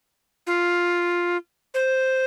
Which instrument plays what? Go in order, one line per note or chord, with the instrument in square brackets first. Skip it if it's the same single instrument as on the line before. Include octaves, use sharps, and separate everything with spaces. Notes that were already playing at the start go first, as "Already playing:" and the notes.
[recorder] F4
C5